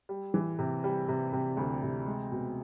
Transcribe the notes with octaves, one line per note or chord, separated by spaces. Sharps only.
G3
E3
C3
G3
C3
C3
D2
C3
G#3
B2